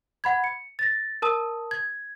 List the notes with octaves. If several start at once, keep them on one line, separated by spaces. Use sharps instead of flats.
F#5 B5 G#6
C#7
A6 A#6
A#4 A5 D#6
G#6